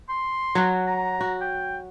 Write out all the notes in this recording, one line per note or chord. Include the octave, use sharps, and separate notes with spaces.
C6
F#3 F#4
A#5
F#4
G5